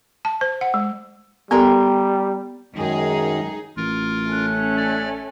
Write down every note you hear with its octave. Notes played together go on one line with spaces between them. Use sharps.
A5
C5
F#5
G#3
G3 B3 G4 A4 A#4 G5 C6
F#2 D#3 G#3 D#4 G#4
A1 F4 A#4
A3 C#4 F#6
D5